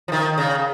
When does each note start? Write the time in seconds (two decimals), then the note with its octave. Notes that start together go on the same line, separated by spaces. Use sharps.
0.08 F3
0.12 D#3
0.38 C#3